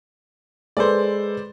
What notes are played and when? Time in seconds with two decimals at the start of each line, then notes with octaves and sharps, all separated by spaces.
0.77 G#3 A4 B4 C5 D5